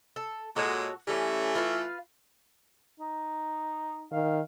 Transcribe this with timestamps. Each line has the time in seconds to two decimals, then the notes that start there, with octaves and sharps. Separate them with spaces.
0.16 A4
0.56 A#2 G#3 F#4 A4 C#5
1.07 E3 G3 A3 C#4
1.55 F4 B4 F5
3.00 D#4
4.12 D#3 F5